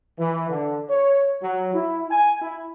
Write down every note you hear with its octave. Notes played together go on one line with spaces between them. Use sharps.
E3
D3
C#5
F#3
E4
G#5
E4